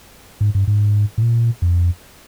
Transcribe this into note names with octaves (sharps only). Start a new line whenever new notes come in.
G#2
G2
G#2
A2
A#2
F2